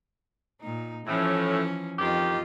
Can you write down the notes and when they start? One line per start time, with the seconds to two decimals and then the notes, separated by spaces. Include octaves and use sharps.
0.61 A#2 D#4
1.07 A2 E3 F3 C#4
1.99 F2 D#3 F4 G4 D#5